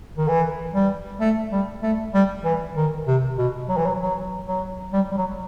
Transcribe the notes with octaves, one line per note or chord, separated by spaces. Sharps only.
D#3
E3
G3
A3
G3
A3
G3
E3
D#3
C3
B2
F#3
E3
F#3
F#3
F#3
G3
G3
F#3